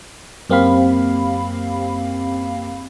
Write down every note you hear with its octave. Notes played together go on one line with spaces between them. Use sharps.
F#2 A#3 C4 G4 F5 B5